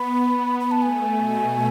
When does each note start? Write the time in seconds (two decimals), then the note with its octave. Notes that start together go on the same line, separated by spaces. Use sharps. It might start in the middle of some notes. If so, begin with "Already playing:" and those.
Already playing: B3 B5
0.60 B5
0.71 A5
0.82 A3 G#5
1.17 B2